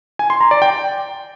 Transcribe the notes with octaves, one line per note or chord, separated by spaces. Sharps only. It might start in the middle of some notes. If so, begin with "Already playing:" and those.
G#5
C6
A#5
D5
G5